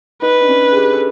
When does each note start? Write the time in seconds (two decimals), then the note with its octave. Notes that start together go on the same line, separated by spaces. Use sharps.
0.22 D#4 B4
0.41 D4
0.49 C#4
0.71 G#4
0.76 G4
0.93 A4